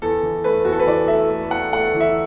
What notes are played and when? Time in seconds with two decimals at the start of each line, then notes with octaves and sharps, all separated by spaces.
0.02 E2 A4
0.23 E3
0.44 A3 B4
0.65 E2 F#4
0.72 A4
0.80 B4
0.87 E3 D5
1.08 A3 E5
1.30 A3
1.51 E2 F#5
1.73 A3 F#5
1.94 E3
2.00 E5